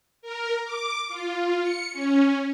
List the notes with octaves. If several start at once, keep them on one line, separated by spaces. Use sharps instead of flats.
A#4
D6
F4
C#7
C#4